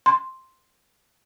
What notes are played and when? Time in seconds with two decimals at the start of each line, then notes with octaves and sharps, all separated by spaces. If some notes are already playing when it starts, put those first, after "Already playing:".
0.06 C6